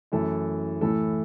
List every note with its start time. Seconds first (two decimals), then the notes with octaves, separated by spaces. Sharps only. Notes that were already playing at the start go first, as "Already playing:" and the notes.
0.12 F#2 E3 A3 A4
0.81 A2 E3 A3 A4